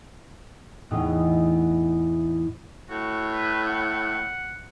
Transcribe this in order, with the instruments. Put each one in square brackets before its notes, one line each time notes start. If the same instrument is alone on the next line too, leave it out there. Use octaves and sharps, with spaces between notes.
[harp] E2 A2 B3 D#4
[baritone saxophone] A2 [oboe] F#4
[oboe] B4
F#5